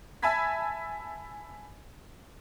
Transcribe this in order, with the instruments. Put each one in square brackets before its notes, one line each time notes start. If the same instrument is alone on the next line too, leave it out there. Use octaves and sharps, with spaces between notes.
[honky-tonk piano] E5 G#5 A5 B5 G#6 B6